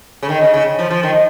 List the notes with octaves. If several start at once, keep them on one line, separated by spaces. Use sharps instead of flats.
C#3
D#3
C#3
C#3
F3
F3
D#3